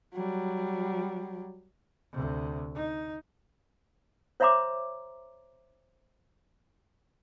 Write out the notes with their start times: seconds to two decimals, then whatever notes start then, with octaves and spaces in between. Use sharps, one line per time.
0.14 F#3 G3
2.12 D2 C3
2.75 D#4
4.40 C5 C#5 E5 A#5 C6 D6